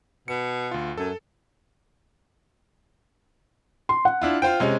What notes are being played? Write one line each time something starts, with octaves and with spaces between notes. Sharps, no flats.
B2 C#7
D2 F4
F#2 A4
C6
F#5
D4 E4 F4
F4 C5 G5
C3 G#3 C#4